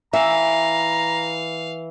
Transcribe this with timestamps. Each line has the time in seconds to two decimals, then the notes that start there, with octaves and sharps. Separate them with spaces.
0.13 E3 E5 F5 A#5